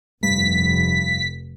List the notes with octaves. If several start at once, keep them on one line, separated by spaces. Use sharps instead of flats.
F1 G2 B6